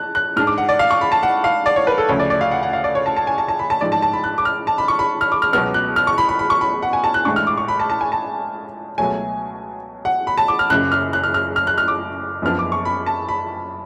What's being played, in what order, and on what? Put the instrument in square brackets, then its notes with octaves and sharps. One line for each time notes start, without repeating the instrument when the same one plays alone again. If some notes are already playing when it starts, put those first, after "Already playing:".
Already playing: [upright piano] A5 F#6
F#6
G#2 G#3 D4 F6
D6
F#5
D5
F5
C#6
B5
A5
F#5
F5
D5
C#5
B4
A4
D2 C#3 F3 A3 C#5
D5
D5
F5
F#5
F#5
F5
D5
C#5
A5
A5
G#5
A5
A5
B5
A5
A1 G#2 F3 D5
A5
A5
B5
F#6
D6
F6
A5
B5
C#6
B5
F6
D6
F6
C#2 B2 F#3 B3 F6
F#6
F6
C#6
B5
B5
B5
C#6
B5
F#5
G#5
A5
F#6
A1 A2 G#3 D4 C#6
F6
D6
C#6
B5
A5
A5
G#5
A5
C#2 B2 F#3 A3 C#4 G#5
F#5
B5
A5
D6
F6
F#1 F#2 C#3 F#6
F6
F#6
F6
F6
F6
F#6
F6
D6
F#1 F#2 F3 B3 D4 F6
D6
C#6
B5
A5
B5